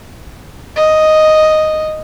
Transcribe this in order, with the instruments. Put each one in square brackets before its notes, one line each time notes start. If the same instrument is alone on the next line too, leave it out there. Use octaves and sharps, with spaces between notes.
[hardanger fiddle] D#5